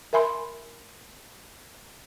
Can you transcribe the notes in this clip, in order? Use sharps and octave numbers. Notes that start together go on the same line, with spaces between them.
A#4 E5 G#5 B5 C6